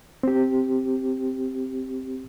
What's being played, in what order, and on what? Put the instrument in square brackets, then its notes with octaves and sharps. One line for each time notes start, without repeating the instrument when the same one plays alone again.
[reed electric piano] C4 G4